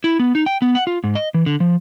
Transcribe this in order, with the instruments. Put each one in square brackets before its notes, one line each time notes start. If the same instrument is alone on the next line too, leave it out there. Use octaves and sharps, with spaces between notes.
[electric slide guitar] E4
B3
D#4
G5
B3
F#5
F4
G#2
D#5
E3
D3
F3